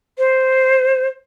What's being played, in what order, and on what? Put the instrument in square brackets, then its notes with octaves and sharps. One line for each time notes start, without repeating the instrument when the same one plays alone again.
[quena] C5